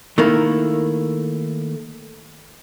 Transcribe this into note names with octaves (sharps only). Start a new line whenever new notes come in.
D#3 A3 A#3 E4